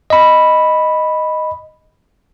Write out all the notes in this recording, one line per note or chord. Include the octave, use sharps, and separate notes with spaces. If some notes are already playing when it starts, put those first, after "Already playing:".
D#5 B5